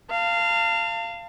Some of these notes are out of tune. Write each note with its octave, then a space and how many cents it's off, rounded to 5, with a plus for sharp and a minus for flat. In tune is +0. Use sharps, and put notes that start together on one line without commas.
F5 -15 A5 +35